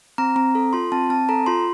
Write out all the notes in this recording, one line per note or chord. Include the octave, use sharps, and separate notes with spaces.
C4 A#5
C4 A#5
A4
F4 C6
C4 A5
C4 A5
A4 A#5
F4 C6